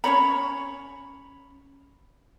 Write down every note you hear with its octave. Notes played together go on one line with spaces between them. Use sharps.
C#4 D#4 C#5 B5